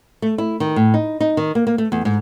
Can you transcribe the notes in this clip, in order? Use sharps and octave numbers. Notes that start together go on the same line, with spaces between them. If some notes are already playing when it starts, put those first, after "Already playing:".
A3
E4
D#3
A2
D#4
D#4
D#3
A#3
A#3
A3
E2
G#2